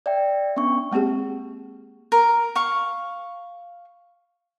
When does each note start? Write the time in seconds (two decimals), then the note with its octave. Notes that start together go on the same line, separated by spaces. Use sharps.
0.06 D5 E5 G5
0.56 B3 C#4 D4 C#6
0.91 G#3 A#3 C4 G4 G#4
2.12 A#4
2.55 F5 C#6